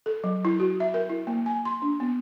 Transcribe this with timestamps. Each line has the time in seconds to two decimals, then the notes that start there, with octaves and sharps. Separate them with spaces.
0.06 A4
0.24 F#3
0.45 E4
0.60 F#4
0.80 E5
0.94 A#4
1.09 E4
1.27 A#3
1.46 G#5
1.65 C6
1.82 D4
2.00 B3